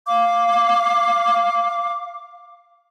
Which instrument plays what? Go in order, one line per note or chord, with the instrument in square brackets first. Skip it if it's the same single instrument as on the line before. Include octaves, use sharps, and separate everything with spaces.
[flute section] F5 D6